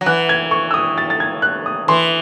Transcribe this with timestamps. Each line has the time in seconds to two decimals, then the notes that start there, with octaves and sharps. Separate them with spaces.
0.01 F#3
0.06 E3 F#6
0.29 G#6
0.51 C#6
0.71 E6
0.74 D#6
0.98 A6
1.10 A6
1.20 G#6
1.42 F#6
1.66 D#6
1.88 E3 C6